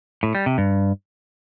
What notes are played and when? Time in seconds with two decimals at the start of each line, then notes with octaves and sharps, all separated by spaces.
0.23 A2
0.35 G3
0.46 C3
0.58 G2